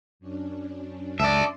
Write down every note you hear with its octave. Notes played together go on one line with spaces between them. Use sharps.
F#2 C#4 D4
C#2 D5 E5 A5 C6